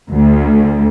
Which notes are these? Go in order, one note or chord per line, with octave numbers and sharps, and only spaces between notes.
D2